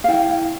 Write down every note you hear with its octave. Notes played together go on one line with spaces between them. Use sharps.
F5
E4 G5